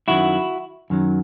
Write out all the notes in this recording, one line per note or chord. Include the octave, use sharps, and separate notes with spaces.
F#2 D#3 F#3 E4 F#4
F#2 D#3 F#3